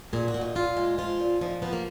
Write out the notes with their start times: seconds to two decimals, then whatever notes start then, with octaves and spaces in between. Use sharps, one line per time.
0.13 A#2 G#4
0.28 F#4
0.34 A#2
0.41 D#4
0.55 A#2 F4
0.77 G#3
0.98 F3 F4
1.20 A#2
1.41 F3 D#4
1.62 F3 B3
1.73 A#3